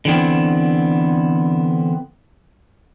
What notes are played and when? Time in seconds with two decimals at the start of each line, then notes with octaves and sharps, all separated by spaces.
0.05 D3 E3 B3 C4